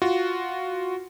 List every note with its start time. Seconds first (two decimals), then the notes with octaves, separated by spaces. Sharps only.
0.02 F4 F#4